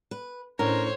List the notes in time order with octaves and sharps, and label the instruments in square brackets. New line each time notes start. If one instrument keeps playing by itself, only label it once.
[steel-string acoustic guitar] B4
[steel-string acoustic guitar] A2 [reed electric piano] C#4 D4 E4 [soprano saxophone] A#4 [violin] C5 C#5